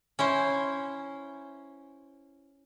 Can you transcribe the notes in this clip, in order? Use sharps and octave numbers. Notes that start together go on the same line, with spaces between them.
C#4 E4 C5